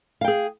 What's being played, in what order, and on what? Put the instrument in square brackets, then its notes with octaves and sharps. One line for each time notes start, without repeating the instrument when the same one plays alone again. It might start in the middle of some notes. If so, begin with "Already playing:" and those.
[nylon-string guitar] F5
G5
G#4